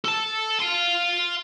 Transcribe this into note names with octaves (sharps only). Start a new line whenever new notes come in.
A4 A5
F5 C6